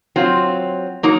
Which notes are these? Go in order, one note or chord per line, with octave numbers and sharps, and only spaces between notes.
F#3 C4 F4
F#3 A#3 D#4